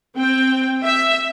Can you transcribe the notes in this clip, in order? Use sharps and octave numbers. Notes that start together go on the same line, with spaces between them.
C4 G5
E5